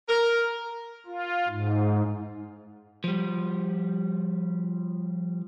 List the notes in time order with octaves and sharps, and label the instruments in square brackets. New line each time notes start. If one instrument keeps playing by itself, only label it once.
[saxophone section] A#4
[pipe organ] F4
G#2
[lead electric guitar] F3 G3